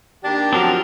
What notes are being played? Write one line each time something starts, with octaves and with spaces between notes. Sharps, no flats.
D#3 A#3 D4 G4
F3 F#3 C4 D4 A#4